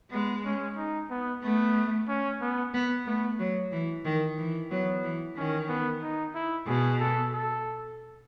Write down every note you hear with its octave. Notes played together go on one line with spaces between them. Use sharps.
G#3 B3
C#4
D#4
B3
A3 B3
C#4
B3
B3
A3 B3
F#3
E3
D#3
E3
F#3 B3
E3
D#3 C#4
B3
D#4
E4
B2 G#4
A4
A4